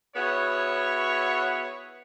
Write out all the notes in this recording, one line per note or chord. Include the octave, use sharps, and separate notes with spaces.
B3 E4 F#4 G#4 C#5